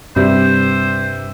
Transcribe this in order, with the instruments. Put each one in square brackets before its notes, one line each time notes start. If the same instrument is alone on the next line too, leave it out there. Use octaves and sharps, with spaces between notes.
[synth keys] G2 [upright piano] C3 [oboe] C5